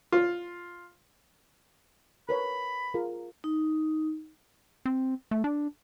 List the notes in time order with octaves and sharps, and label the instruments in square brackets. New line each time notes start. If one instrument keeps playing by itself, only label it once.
[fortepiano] F4
[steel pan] A#4 B4 C#5 [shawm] B5
[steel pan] F4 G#4 A#4
[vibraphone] D#4
[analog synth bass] C4
A3
D4